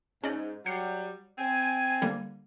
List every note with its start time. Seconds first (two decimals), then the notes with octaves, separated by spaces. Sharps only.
0.24 G#2 C#4 D5
0.66 F#3 G3 G6 C7 C#7
1.38 C4 G#5
2.02 D3 G3 A#3